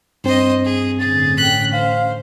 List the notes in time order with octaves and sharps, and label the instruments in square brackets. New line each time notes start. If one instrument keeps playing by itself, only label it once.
[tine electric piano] G2 C4 [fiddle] C5 D#5
[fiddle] G#4
[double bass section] A1 D3 C#4 [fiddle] G#4 [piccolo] A6
[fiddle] G5 F#6 [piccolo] B6
[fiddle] C5 [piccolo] F5